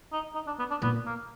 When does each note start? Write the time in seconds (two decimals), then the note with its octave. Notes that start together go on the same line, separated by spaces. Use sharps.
0.12 D#4
0.35 D#4
0.47 D4
0.59 B3
0.71 D4
0.82 A#2 B3
1.06 A#3